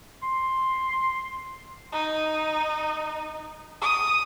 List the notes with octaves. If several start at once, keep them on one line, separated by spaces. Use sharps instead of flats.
C6
D#4
D#6